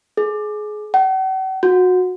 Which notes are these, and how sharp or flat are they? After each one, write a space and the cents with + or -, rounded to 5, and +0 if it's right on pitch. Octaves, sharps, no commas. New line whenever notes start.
G#4 +25
F#5 +45
F#4 -20